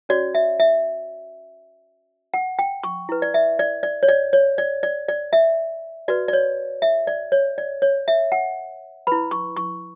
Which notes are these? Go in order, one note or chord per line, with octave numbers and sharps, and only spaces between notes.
C#4 F#4 C#5 D5
E5
E5
F#5
G5
C#6
E4 B4
D5
E5
D5
D5
C#5
D5
C#5
D5
D5
D5
E5
F#4 B4 D5
D5
C#5
E5
D5
C#5
D5
C#5
E5
F#5
E4 B4 B5
C#6
C#6